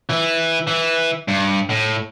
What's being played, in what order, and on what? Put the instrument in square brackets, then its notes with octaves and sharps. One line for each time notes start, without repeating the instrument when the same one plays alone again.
[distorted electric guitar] E3
E3
G2
A2